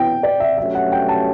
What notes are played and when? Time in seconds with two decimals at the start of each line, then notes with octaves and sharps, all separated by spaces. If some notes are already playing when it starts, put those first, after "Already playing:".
Already playing: F#2 E3 B3 E4 G5
0.23 D5
0.40 E5
0.58 G2 F#3 A3 C#4 G4 E5
0.75 F#5
0.92 G5
1.09 A5